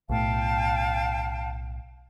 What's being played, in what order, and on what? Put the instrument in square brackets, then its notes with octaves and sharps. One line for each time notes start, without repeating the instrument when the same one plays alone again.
[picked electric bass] B1 A2 [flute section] F5 G5 A5